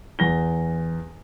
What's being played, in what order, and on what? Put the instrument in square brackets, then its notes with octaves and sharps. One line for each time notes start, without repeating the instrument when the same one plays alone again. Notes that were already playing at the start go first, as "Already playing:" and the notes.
[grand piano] E2 A#6 G7